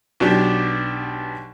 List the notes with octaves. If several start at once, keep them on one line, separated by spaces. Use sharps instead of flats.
B1 B2 D4 G4